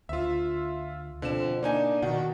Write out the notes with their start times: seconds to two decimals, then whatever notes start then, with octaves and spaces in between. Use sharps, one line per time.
0.09 D2 F4 E5
1.22 F2 B2 D3 E7
1.63 A#3 D4 D#4 G#5
2.02 B2 D#3 F#4